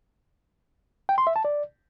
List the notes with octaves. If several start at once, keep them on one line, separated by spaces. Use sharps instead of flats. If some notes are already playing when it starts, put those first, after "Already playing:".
G5
C6
E5
A5
D5